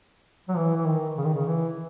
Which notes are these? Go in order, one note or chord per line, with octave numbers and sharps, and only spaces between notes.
F#3
E3
E3
D#3
C#3
D#3
C#3
E3